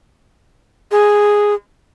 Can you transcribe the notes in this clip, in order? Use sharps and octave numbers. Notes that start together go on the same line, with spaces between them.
G#4